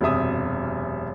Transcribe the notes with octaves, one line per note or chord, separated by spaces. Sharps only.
E1 F#2 C3 E5 D#6